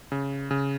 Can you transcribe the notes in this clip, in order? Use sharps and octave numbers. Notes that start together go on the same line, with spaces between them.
C#3
C#3